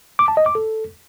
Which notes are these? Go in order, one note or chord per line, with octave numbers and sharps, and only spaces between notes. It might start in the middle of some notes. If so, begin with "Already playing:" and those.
D6
A5
D#5
D6
A4